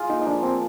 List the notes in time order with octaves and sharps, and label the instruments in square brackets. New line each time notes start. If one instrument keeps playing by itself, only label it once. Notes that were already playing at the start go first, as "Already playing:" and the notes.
Already playing: [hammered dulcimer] F4 G#4
[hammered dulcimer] A#3 [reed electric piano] D#4
[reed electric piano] D#4
[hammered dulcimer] F3 [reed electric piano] D4
[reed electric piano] C4 [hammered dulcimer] D4